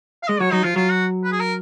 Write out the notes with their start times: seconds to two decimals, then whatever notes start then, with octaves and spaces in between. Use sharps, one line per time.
0.23 F5
0.28 G#3 D#5
0.40 F#3 C#5
0.52 F#3 D#4
0.64 F3 F4
0.76 F#3 F4
0.91 F#4
1.24 B4
1.32 G#4
1.40 A#4